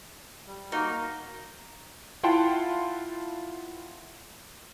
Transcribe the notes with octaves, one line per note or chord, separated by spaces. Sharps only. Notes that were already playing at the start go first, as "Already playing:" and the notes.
G3
A#3 D#4 F#4 A#4
E4 F4 F#5 G5 A5 C6